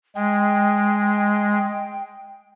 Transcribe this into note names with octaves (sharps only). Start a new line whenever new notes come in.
G#3 G5